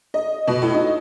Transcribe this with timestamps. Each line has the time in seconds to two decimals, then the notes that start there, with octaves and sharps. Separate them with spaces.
0.14 D#5
0.47 B2
0.62 A2
0.74 D#4